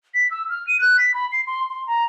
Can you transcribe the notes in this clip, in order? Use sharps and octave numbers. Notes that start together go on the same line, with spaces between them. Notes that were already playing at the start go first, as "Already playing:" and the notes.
B6
E6
F6
D#7
F#6
B6
B5
C7
C6
C6
A#5